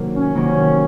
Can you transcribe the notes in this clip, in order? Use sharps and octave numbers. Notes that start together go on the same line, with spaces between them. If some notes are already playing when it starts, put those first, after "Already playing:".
Already playing: C3 D#3 F#3 A#3
C#4
C3 D#3 F#3 A#3